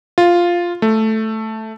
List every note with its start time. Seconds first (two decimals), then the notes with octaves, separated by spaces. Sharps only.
0.18 F4
0.82 A3